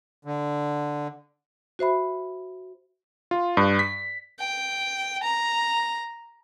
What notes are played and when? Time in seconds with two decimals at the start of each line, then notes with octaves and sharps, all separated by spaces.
0.25 D3
1.79 F#4 C5 E5 B5
3.31 F4
3.57 G2
3.79 B6
4.39 G5
5.23 A#5